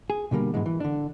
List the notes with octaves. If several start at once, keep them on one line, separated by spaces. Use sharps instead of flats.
G#4
B2 D3 G3 A#3
G#2 B2 E3 F#3 G#3
E3
D3 D4